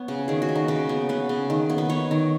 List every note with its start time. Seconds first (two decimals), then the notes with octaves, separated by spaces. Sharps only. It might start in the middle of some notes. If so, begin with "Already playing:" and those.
Already playing: B3 C#5
0.08 C#3
0.28 D#3 G#4
0.42 F#4
0.49 B3
0.55 D#4
0.68 C#3 B4
0.89 B3
1.09 B3 B4
1.29 C#3
1.50 D#3
1.70 B3
1.78 B4
1.89 B3 C#5
2.11 D#3